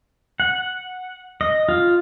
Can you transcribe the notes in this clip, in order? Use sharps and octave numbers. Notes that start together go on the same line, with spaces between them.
F#5
D#5
F4